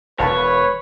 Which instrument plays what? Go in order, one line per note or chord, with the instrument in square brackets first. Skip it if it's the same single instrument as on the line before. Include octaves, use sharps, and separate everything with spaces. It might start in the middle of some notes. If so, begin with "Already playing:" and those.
[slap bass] E1 [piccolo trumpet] B4 [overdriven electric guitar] C#5 [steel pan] F5 A5 B5